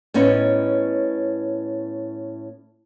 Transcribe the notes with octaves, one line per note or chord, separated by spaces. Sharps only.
A2 B3 C#4 D#4